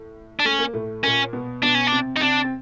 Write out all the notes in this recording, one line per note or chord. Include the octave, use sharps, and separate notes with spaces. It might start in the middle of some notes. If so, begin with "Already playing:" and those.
Already playing: A2
D4
A3 C#4
A#3
A2 A3
A#2 A#3 C#4
B2 B3
B2 B3 D4
C#4
D4
C3 C4
D#4
C3 C4 D4
C4